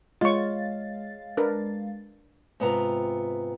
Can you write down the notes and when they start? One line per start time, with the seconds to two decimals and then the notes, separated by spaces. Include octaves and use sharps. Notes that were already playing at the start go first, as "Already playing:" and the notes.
0.21 G#3 F4 C#5 D#5 F5 C#6 A6
1.37 D4 A#4 B4
2.60 G#2 C3 B3 F4 A#5